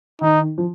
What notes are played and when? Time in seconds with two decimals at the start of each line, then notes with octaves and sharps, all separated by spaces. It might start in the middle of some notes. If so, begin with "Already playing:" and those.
0.21 D#3 D#4
0.58 F3